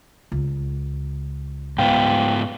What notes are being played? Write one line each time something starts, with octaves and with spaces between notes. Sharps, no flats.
C#2
G#2 B3 F5 G5